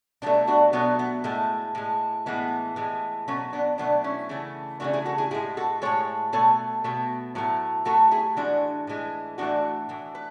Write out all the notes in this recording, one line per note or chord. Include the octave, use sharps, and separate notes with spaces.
B2 F#3 A3 B3 D4
D4 F#4
B2 F#3 A3 B3 D4
B3
A2 G#3 A3
A2 G#3
A2 E3 G#3 B3
A2 E3 G#3
B2 F#3 A3 C#4
B3 D4
B2 F#3 A3 B3 D4
C#4 E4
C#3 E3 A3
C#3 E3 A3 D4 F#4
E4 G#4
F#4 A4
E4 G#4
A2 G#3 E4 G#4
F#4 A4
A2 G#3 A4 C#5
B2 A3 A4 C#5
B2 A3
A2 F#3 A3
A2 F#3 A3 F#4 A4
E4 G#4
A2 E3 G#3 D4 F#4
A2 E3 G#3
A2 E3 A3 D4 F#4
A2 E3
B4